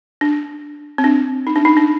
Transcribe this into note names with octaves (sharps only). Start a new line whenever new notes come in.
D4
C4
D4
D#4
D4
D#4
D4